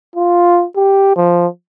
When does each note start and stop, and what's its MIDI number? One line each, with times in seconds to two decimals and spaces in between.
0.15 0.65 65
0.76 1.14 67
1.16 1.47 53